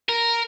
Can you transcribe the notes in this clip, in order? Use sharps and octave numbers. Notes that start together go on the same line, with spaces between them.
A#4